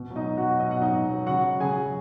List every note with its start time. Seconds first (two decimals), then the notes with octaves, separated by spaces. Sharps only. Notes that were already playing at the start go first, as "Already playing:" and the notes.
Already playing: B2
0.10 F#3
0.16 D#4 D#5
0.27 B2
0.37 F#4 F#5
0.43 F#3
0.60 B2 D#5
0.71 F#5
0.77 F#3 D#4 D#5
0.94 B2
1.10 F#3
1.26 C#3 F#4 F#5
1.44 F#3
1.60 C#3 G#4 G#5
1.78 F#3